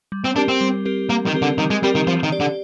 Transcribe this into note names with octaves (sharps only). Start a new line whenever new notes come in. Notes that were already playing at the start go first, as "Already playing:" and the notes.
G3
C4
C4 D4 G4 A#4
C4
G3
C4 G4 A#4
G3 A#3
D#3
C4 G4 A#4
D3
D#3 G3
G#3
G3 C4 G4 A#4
D#3
F3 C4
D#3
G4 D5
D3